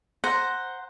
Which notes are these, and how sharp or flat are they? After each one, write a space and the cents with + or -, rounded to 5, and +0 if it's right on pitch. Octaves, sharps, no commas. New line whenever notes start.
C5 +0 F#5 +0 A#5 +0